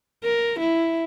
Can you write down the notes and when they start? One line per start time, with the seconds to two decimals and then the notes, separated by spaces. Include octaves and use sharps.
0.24 A#4
0.60 E4